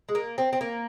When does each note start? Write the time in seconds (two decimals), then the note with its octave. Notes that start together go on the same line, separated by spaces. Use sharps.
0.09 G#3
0.15 A#3
0.38 C4
0.53 C4
0.61 A#3